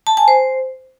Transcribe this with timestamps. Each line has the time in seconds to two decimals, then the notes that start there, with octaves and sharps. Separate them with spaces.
0.07 A5
0.17 G#5
0.28 C5